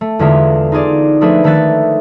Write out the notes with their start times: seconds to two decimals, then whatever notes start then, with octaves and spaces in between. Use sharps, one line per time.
0.01 A3
0.19 E2 D3 G#3 F4 E5
0.72 D#4 F4 G#4 D5
1.21 F3 A3 D4 G#4 B4 E5
1.44 D#3 A3 C#5 E5 F#6 A6